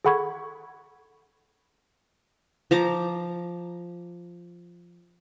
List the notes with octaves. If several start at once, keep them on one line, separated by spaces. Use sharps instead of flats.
G#4 A4 F#5 B5 C#6 G#6
F3 A#5 D6